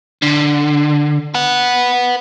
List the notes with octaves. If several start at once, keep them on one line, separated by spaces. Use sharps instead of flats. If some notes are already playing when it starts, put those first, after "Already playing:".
D3
B4 F#5